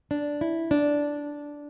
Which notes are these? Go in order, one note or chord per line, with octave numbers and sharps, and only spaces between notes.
D4
E4
D4